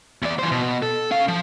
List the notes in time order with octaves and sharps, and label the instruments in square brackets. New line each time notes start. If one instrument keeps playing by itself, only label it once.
[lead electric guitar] E2 D5
E3 C5
B2
A4
C#4 F5
F3